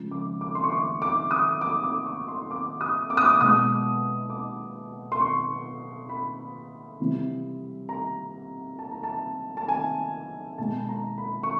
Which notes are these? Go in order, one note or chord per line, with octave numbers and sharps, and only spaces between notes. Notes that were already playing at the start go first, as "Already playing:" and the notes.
Already playing: C#3 F3 G#3
D6
D6
C6
C#6
D6
D6
D#6
D6
D6
C#6
C6
D6
D#6
D6
D#6
D6
B2 G#3 D#6
D6
C6
C#6
B5
C3 E3 G3
A#5
A5
A#5
A5
A5
G#5
B2 G#3 A5
A#5
B5
C#6